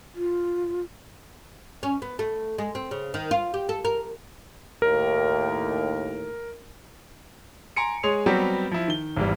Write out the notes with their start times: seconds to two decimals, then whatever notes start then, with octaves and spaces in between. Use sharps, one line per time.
0.15 F4
1.83 C#4
2.02 B3
2.19 A3
2.58 G#3
2.75 C4
2.91 C#3
3.14 D#3
3.31 F4
3.54 G4
3.69 A4
3.85 A#4
4.82 D#2 A2 A#4
7.76 G#5 A#5 C6 C#7 D7
8.03 G#3 G#4 C#5 C6 F7
8.26 F#3 G3 B3 C4 F#4 G4
8.71 F3 E4
8.88 D#3 G7
9.16 G#1 E2 E3 G3